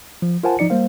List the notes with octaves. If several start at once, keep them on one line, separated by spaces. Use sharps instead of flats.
F3
F4 A#4 C5 F#5 G#5 A5
F3 D#4 D5 C#7
G3 A#3 C5 F5